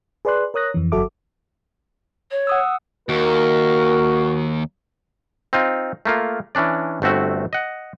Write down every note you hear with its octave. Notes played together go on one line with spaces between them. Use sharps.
G#4 B4 D5 C6 F#6
A#4 C#5 D#6 F#6 A#6
F2 E3
G1 F#3 F#4 A4 E5 D6
C#5
F#5 D#6 E6
D#2 F#4 A#4
C4 D#4 F4
A3 A#3 F4
E3 C#4 D4 D5
G1 A3 C4 F#4 E5
D#5 F#5